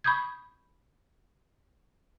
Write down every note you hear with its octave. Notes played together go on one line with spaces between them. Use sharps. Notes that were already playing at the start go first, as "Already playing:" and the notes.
B5 C#6 D#6 G6 G#6